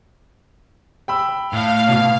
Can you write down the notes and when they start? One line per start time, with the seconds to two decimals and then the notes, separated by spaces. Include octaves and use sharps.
1.08 G5 B5 E6
1.53 A2 F5
1.89 B2